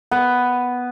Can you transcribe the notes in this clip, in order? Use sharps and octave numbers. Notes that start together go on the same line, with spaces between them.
B3